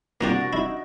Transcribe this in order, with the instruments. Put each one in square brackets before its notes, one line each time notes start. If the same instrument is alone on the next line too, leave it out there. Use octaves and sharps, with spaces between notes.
[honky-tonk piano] C2 A#6 [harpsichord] A#3 D#4 G4 [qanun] D4 F#4 D5
[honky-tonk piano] D#4 [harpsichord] E4